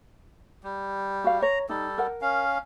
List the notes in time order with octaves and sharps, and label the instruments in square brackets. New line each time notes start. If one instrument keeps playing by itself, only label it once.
[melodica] G3
[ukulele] F#4 F5
[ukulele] C#5 [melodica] A#5
[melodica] G3 A4 [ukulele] D#4
[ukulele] A#4 F#5
[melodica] C#4 F5